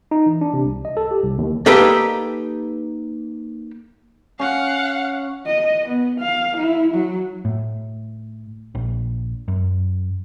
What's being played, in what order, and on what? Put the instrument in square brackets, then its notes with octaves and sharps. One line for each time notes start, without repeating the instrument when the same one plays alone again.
[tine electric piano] D#4
E3
D4
C3
C2
D#5
A4
G4
C2
D#2
[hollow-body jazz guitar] A#3 D#4 G4 A4 B4
[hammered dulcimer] C#4 [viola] F5 F#5
[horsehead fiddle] D#5
B3
F5
E4
F#3
[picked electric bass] A2
A#1
F#2